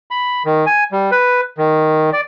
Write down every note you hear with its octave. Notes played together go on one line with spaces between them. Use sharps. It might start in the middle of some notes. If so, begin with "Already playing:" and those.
B5
D#3
G#5
G3
B4
D#3
D5